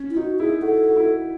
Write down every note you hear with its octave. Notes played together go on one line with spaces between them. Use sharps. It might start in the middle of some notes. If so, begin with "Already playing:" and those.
Already playing: C#4
E4
D#4 F#4
E4 G#4
F#4 A4
F#4
E4